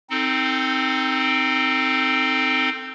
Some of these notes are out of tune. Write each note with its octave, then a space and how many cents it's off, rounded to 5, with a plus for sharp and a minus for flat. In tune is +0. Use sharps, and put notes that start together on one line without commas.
C4 +0 D#4 +0 A4 +20